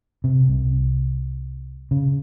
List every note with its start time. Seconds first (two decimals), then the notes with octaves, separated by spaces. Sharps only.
0.24 C3
0.49 C2
1.91 C#3